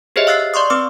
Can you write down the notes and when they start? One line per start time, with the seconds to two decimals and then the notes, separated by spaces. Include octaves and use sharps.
0.16 G4 G#4 C5 C#5 D#5 E5
0.27 F5 E6 F#6 A6 C7
0.54 D5 C6 C#6 D#6
0.70 C4 B4 D6 E6